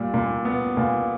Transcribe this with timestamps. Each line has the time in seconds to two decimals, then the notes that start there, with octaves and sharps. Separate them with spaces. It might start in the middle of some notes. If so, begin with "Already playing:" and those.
Already playing: A#2 G3
0.14 A#2
0.45 B3
0.77 A#2